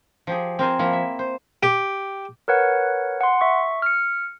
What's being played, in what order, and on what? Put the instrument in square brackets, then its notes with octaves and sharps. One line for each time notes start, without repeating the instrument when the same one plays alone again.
[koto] F3 G4 G#4
C4 A#4 C5 G#5
F3 A#3 E4
E5
C5
[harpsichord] G4
[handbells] A#4 B4 C#5 F#5
F#5 C6
E5 C#6
F6 C#7